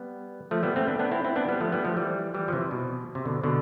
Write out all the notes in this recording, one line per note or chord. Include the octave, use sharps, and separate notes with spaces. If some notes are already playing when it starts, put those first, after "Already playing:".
Already playing: G3 B3
F3 A3
G3 B3
A3 C4
B3 D4
B3 D4
C4 E4
C4 E4
B3 D4
G3 B3
F3 A3
G3 B3
F3 A3
E3 G3
E3 G3
F3
C3 E3
B2
C3
B2 D3
B2 D3